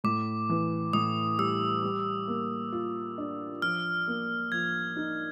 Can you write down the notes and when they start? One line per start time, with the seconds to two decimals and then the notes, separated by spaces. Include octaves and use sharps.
0.04 A2 D6
0.49 E3
0.93 A2 D#6
1.38 G3 E6
1.83 G3
2.28 A#3
2.72 F4
3.18 D4
3.62 F3 F6
4.08 A#3
4.52 F3 G#6
4.96 D#4